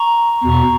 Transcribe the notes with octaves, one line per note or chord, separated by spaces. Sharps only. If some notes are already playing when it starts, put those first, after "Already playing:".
Already playing: A#5 C#6
E2 B2